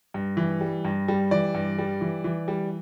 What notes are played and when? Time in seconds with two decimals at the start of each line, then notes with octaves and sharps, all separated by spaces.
0.14 G2
0.37 E3
0.61 G3
0.85 G2
1.08 G3
1.31 E3 D5
1.55 G2
1.79 G3
2.01 E3
2.24 E3
2.48 G3